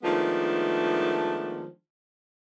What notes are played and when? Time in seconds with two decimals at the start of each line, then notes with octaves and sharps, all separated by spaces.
0.03 D#3 F3 G#3 A3 B3 D4